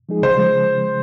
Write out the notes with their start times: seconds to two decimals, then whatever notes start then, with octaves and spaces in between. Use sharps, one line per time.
0.09 F3 G#3 D#4 G#4
0.23 C#3 C5
0.38 F3 G#3